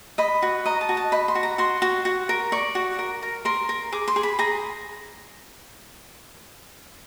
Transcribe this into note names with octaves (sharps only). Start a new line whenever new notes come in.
D#5 B5
F#4
D#5 A#5
A5
F#4
A5
D#5 B5
C6
F#4
A#5
F#4 C6
F#4
F#4
A#4
D5 C#6
F#4
A#4
A#4
A#4 C6
A#4
G#4 D6
C6
G#4
B5
G#4 A#5